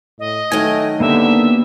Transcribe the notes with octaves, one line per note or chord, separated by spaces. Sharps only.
A2 D#5
D#3 F#3 A3 G#5
D3 A#3 B3 G4 E5